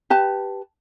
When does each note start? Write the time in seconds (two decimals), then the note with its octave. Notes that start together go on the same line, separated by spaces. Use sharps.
0.10 G4 B4 A5